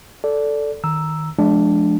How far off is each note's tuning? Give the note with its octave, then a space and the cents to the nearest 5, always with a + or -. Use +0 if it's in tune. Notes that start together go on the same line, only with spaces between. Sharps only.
A4 +0 D5 -10
D#3 +0 A#5 +0 E6 +0
F3 +0 G#3 +40 D4 +0